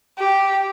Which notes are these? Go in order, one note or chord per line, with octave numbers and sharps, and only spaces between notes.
G4